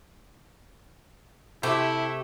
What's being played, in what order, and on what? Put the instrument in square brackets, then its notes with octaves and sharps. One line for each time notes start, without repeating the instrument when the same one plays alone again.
[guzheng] C3 [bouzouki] A3 G4 [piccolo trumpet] E4